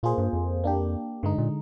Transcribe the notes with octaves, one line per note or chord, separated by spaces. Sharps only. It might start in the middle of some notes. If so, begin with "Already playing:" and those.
A#2 A#3 F4 G#4 C5
G2
F2
A#3 D4 G4
G2 D3 G#3 D#4
A#2